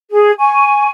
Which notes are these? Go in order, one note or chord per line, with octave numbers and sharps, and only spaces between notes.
G#4
G#5 C#6